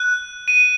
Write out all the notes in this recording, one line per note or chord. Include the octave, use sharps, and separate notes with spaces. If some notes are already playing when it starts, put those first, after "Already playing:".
Already playing: F#6
D#7